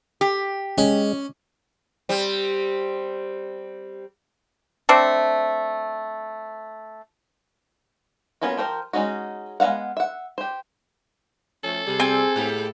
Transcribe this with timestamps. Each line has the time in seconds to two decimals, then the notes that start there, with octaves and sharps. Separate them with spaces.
0.21 G4
0.78 G#3 C#4
2.09 G3 C4
4.89 A3 C4 D4
8.42 A#3 B3 C#4 F4 F#4
8.57 F3 G4 A#4 C5
8.93 G#3 A#3 C#4 D#4 F#4
9.60 G#3 B3 F#4 F5 F#5
9.97 E5 F#5
10.38 G4 C5
11.64 F3 A3 C#4 A4
11.86 C3 G3 G#4
12.00 C4 G#5
12.35 A2 G#3 A#3 G4